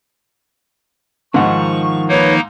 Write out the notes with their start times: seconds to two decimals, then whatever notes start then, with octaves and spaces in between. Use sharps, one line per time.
1.34 G#2 D#3 F3 F#5 C#6
2.08 A#3 D#4 B4 C#5